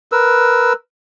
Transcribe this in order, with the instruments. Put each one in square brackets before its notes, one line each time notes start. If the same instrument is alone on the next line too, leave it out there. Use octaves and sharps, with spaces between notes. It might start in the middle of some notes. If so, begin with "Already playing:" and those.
[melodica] A#4 B4 E6